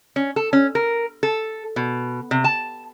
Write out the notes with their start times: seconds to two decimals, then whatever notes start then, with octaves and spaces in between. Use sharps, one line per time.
0.16 C#4
0.36 A4
0.53 C#4
0.75 A#4
1.23 A4
1.76 B2
2.31 C3
2.44 A5